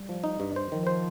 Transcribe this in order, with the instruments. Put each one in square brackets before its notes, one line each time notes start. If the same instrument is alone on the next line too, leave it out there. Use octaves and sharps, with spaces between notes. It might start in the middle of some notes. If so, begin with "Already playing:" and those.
Already playing: [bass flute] G3
[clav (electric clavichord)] F3
D#4
G2
C5
[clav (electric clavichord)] D#3 [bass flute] F3
[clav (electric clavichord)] C5